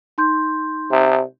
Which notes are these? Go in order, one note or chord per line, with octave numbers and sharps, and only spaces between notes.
D#4 C6 G6
C3